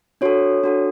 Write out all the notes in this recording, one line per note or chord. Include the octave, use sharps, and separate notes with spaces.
D4 F#4 A4 C#5
D4 F#4 A4